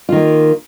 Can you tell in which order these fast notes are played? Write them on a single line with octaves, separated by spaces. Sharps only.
F4 D#3 A#3